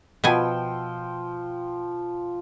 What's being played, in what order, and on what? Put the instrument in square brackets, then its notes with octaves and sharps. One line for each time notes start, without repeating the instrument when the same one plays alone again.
[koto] B2 B3 G#5 [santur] F3 G5 E6